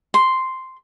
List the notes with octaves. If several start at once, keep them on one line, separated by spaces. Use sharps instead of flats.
C6